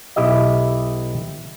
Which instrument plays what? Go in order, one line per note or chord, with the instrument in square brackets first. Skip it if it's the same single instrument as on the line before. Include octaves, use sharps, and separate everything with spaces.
[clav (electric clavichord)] B1 E4 G4 D#5 E5